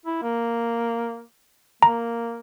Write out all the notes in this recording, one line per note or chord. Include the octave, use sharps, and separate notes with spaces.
E4
A#3
A#3 A#5